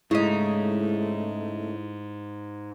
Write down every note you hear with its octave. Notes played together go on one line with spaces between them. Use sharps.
G#2 C#3 A3 D#4 E4